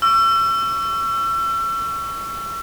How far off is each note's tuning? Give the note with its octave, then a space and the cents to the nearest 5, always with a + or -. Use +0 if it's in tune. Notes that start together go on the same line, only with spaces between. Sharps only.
C#6 +20 E6 +35